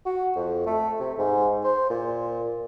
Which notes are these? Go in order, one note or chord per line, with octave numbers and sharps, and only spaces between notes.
F#4
F2
A3
C3
G#2
C5
A#2